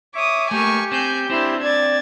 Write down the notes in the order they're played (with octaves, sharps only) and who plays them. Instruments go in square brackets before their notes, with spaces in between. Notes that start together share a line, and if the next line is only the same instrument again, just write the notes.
[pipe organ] C#5 E5 [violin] D6 D#6
[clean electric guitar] A3 A#3 [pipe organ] G4 [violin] G#5 C#6
[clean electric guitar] C4 [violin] G#5 G6
[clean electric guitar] C4 D4 [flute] E4 [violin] C5
[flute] D5 [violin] G#6 A6